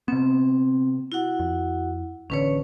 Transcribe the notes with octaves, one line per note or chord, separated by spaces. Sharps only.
C3 B3 C4
E4 F#4 F#5
F2
A1 D3 C#4 B4 C#5